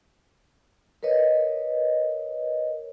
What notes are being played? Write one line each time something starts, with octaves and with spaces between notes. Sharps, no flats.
A#4 B4 C#5 D#5